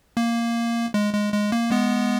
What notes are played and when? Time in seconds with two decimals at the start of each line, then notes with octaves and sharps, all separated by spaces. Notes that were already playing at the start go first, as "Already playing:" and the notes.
0.17 A#3
0.94 G#3
1.13 G#3
1.33 G#3
1.52 A#3
1.71 G#3 B3